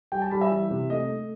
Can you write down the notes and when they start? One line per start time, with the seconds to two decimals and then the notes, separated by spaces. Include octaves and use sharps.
0.12 G3 G5
0.22 A5
0.31 G3 B5
0.41 E5
0.51 E3
0.70 C3
0.90 A3 D#5
1.09 A3